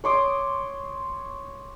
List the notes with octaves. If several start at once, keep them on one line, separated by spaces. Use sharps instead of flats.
C#5 C6 D6 D#6